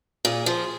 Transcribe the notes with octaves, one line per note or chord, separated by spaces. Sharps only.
A#2 G#4
F3